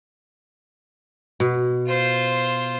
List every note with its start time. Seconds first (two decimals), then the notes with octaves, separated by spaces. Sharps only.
1.40 B2
1.87 F4 C5